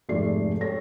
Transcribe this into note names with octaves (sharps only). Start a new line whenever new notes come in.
F1 G#2 G#3 A3 D5 C7
G4 A4 C#5 A#6